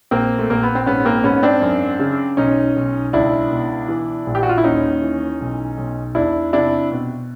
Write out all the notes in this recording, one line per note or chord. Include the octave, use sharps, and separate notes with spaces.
A#1 A#3 C4
A3
A#1 A#3
B3
C4
G#2 B3 C#4
A#3 C4
G#2 B3 C#4
C4 D4
F#2
C#3
B1 C#4 D#4
B1
C#2 D4 E4
B2
E3
A#1
G4
F#4
F4
E4
D#2 C#4 D#4
E3
B1
B1
E2 D4 E4
C3 D4 E4
B2